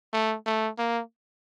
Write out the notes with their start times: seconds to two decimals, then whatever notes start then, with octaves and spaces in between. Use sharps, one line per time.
0.13 A3
0.46 A3
0.78 A#3